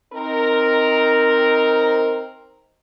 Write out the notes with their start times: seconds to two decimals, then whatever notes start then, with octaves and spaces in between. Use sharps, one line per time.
0.13 C4 D#4 A#4